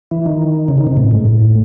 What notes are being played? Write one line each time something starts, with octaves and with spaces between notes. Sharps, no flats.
E3
D#3
C#3
D#3
C3
A2
G#2
A2